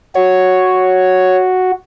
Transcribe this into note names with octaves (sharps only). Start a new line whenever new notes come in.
F#4 C#5